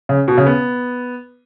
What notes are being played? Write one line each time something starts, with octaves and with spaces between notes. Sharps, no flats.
C#3
B2
C#3
B3